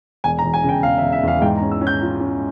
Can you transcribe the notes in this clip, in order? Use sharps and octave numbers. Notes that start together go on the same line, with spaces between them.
E1 G#5
A#5
E1
G#5
C#3 G5
E1 F5
E5
E1
E5
E2 F5
G#2 G5
A#5
C#4
E6
C#4
G6
F4
C#4